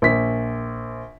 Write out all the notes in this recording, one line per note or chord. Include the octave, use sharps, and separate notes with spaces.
A#1 B6